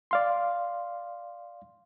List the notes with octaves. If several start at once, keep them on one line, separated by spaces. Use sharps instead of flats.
D5 F5 C6